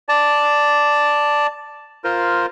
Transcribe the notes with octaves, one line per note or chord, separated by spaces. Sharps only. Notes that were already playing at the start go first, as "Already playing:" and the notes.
D5 A5
F4 A#4 C5